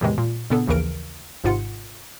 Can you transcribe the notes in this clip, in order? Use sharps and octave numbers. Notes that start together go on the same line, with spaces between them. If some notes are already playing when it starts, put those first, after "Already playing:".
E2 A2 C3 D#3 E3 G#3
A#2
A#2 C#3 B3 D4 A4
A#1 D#2 C#3 E3 A#4 D7
G#1 G#2 C3 F4 F#5 C#7